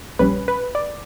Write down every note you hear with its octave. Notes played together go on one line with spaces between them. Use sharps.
A#1 A#2 G3 C#4 B4
B4
D5